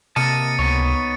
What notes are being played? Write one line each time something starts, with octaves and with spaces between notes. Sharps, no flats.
C3 A#3 A#4 D#5 A5 A6 C#7 D#7
C#2 B3 D#4 C#5